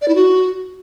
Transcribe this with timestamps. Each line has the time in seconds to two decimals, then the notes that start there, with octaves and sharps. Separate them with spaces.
0.02 D5
0.08 E4
0.15 F#4